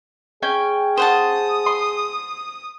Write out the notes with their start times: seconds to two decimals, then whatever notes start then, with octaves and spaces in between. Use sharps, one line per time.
0.42 C#4 G#4 G5 G#5
0.97 C5 F#5 A5 D#6
1.66 C6